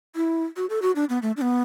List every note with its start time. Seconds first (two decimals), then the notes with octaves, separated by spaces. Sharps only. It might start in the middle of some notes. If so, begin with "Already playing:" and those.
0.16 E4
0.56 F#4
0.70 A4
0.82 F#4
0.95 D4
1.09 B3
1.22 A3
1.37 D4
1.42 B3